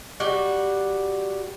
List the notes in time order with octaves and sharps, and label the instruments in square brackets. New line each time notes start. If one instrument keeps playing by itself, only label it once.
[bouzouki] G3 F#4